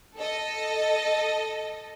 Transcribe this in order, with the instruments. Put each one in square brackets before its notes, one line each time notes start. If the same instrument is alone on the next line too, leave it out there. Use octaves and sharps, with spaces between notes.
[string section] A4 D#5